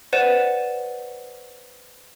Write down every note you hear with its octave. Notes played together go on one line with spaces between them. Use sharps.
B4 C5 D5 F#5 D#7 E7